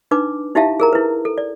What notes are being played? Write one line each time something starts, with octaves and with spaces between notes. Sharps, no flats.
D4 D#4 B4 D6
D#4 E4 G4 E5 F5 A5
G#4 A#4 A#5
E4 B4
A4
D5